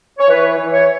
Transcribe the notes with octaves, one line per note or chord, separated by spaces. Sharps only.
C#5
E3 B4
E3
C#5